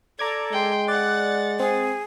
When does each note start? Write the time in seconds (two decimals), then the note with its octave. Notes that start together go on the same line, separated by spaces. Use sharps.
0.19 A4 D5 A#5 D6 G#6
0.52 G#3 G5 C6
0.88 D5 F#5 F#6 A6
1.60 C4 G#4